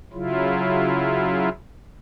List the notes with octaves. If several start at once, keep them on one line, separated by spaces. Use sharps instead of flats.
C#3 F#3 E4 F4